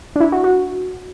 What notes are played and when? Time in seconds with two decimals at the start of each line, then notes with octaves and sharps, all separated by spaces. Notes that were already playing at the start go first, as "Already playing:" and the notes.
0.16 D4
0.20 E4
0.32 F#4
0.44 F#4